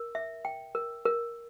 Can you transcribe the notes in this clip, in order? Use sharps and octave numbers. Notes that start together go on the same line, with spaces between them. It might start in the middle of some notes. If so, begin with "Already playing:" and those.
Already playing: A#4
E5
G5
A#4
A#4